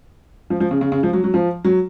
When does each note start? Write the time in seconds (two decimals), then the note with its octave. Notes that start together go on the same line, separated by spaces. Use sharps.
0.50 F3
0.60 F3
0.71 C#3
0.81 C#3
0.92 C#3
1.03 F3
1.13 F#3
1.24 F#3
1.34 F3
1.65 F#3